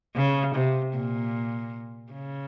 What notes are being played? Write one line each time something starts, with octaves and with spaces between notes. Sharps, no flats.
C#3
C3
A#2
C#3